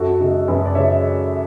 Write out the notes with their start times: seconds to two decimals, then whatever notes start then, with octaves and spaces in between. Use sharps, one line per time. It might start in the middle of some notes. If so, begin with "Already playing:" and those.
Already playing: F#2 F#4 A4
0.20 C#3 G#3
0.48 F#2 G#4 B4
0.65 D5
0.75 C#3 G#3 C#5 E5